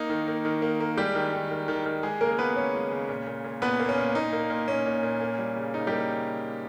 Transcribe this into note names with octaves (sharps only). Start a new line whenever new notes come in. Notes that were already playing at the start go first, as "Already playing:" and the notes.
Already playing: A#3 D#4
D#3
A#3
D#3
A#3
A#3
G3 G#3 G4
D#3
D#3
D#3
D#3
D#3
G#3 G#4
C#3 A#3 A#4
G#3 B3 B4
G#3 C#4 C#5
G#3
C#3
A#2
A#2
A#2
A#2 B3 B4
A#3
C#4
A#2
A#2 D#4
A#3
A#2
A#2 C#4
A#2
A#2
A#3
G3
C#3
C#3 D#4
G3 A#3 G4